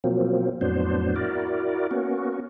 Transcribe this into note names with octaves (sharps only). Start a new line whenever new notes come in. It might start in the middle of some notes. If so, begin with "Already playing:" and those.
B2 F3 F#3 A#3 C4
F2 A2 F#3 B3 D4 C5
E4 F#4 A#4 D5
A#3 B3 C#4 F#4